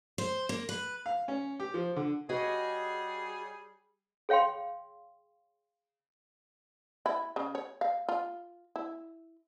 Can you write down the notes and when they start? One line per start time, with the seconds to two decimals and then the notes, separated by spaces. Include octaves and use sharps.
0.18 C5
0.49 A#3
0.69 B4
1.06 F5
1.28 C#4
1.60 G4
1.74 F3
1.96 D3
2.29 G3 F#4 G#4 C#5 D#5
4.29 G#4 C#5 F5 G5 C6
7.06 E4
7.36 C#3
7.55 C#5
7.81 F5
8.09 F4
8.76 E4